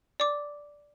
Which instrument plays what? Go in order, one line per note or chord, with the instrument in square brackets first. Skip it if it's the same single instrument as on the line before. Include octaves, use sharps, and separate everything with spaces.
[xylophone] D5 D6